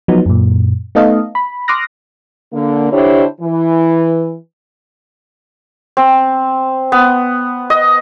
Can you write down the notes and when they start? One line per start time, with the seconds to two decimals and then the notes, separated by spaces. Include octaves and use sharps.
0.08 F3 F#3 B3 D#4
0.26 F#2 A#2
0.95 A3 B3 D#4 A4 D#5 F5
1.35 B5
1.68 C6 D6 D#6 F6 F#6 A#6
2.53 D3 A#3
2.91 D3 D4 E4 G4 C5 C#5
3.41 E3
5.97 C4
6.92 B3
7.70 D#5